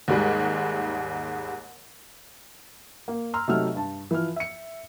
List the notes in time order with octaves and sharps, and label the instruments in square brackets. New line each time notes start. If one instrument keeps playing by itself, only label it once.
[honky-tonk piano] D#2 G#2 G3 G#3
[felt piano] A#3
A#5 C6 E6 F6
C3 F#3 A3 D#4 E6 F6
G2 A5
E3 F3 F6
E5 C#7